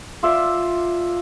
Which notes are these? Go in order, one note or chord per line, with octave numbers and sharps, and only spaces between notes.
F4 D5 E5